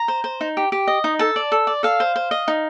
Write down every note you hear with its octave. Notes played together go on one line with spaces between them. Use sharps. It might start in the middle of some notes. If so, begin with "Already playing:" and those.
Already playing: A#5
C5
C5
D#4
G4
G4
D#5
D#4
A4 A5
D5
A4
D5
A4 F5
C5
C5
D#5
D#4